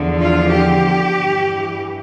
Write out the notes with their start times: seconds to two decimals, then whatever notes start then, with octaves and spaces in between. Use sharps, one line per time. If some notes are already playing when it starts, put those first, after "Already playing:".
Already playing: E2 D3 F3
0.18 F4
0.50 G4
1.15 G2 E3